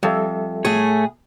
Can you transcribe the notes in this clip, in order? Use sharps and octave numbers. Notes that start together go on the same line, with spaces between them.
F2 G3 A4 E5
A2 A3 G#4 C#5